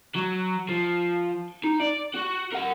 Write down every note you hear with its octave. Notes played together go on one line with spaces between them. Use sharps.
F#3
F3
D#4
D5
F#4
A#4 F#5